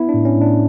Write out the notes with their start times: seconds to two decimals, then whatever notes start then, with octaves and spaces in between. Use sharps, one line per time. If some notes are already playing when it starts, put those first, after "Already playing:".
Already playing: B3 E4
0.09 D4
0.14 A2
0.25 C#4
0.37 A2 D4